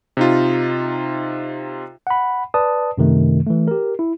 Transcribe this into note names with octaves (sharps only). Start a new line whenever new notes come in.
C3 D#4 F4
F#5 B5
B4 D5 A5 D#6
F#2 C3 D#3 A3
E3 A3
G4 A#4
E4